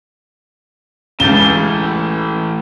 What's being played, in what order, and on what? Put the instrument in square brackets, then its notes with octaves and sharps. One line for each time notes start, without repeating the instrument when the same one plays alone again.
[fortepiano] C#2 C#3 [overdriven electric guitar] A2 E3 [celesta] G6 A6 E7 [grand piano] G7